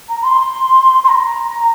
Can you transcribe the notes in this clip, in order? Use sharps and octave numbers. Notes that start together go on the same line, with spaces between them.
A#5
C6
C6
A#5